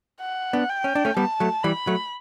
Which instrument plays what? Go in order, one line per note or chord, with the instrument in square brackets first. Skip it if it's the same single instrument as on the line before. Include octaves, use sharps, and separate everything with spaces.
[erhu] F#5
[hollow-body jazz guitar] B3 D4
[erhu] G5
[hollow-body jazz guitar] C#4
D4
A3 C#4
[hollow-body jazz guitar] G3 B3 [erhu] A5
[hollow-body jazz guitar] F#3 A3
[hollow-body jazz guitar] E3 G3 [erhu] B5
[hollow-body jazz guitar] F#3 A3